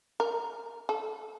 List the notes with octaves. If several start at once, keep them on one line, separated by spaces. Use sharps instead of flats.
A#4
A4